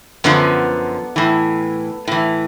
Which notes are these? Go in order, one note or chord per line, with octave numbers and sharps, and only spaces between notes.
F#2 D3 F3 B3
A2 E3
A2 E3